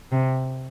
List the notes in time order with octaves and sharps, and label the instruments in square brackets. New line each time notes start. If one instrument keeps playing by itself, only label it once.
[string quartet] C3